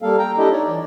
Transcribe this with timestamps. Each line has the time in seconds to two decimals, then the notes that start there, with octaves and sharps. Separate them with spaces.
0.02 G3 A#3 A4 F5
0.19 G5 A#5
0.38 D4 E4 G4 A4 D#5
0.51 D#4 C#5 D5
0.67 E3 D5